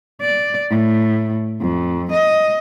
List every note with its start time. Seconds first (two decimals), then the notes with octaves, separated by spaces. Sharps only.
0.21 D5
0.70 A2
1.60 F2
2.11 D#5